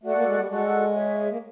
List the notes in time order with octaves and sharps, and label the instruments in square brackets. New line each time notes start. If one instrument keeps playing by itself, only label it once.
[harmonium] A3 [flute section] F#4 A4 D5 F#5
[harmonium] A#3
G#3
G3
[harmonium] G#3 [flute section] F#4 A4 D5 F#5
[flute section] G#4 C#5 E5
[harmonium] A#3